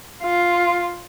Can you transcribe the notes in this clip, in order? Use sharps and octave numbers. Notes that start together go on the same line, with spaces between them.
F4